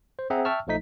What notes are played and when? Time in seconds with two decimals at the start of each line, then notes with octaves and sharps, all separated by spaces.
0.19 C5
0.30 C4 G#4 E5 F#5 A#5
0.45 E5 G5 A5 C#6 E6 F6
0.67 A#1 F3 A3 D#4 B6